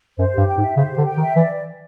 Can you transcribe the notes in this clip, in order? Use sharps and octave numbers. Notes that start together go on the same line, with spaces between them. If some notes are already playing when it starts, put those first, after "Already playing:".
F#2 C5
G2 G4
G5
G#2
E5
C#3 C5
G4
D3
G5
D#3
E5
E3 D5